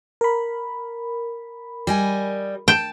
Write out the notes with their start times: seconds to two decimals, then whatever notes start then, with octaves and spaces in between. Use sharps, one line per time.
0.21 A#4 B5
1.87 G3 D#5 G#5
2.68 G5 A5